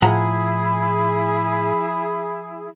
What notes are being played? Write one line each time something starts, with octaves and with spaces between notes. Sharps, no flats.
A2 F3 E4 G#4 F#5 A#5 B5